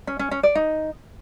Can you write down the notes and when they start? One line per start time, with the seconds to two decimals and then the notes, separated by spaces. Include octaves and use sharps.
0.07 C#4
0.19 C#4
0.31 C#4
0.43 D5
0.55 D#4